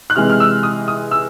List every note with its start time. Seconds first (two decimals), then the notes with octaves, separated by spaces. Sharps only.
0.10 F#6
0.16 C3 E3 G#3 F6
0.30 F6
0.40 E6
0.63 D#6
0.88 D#6
1.11 E6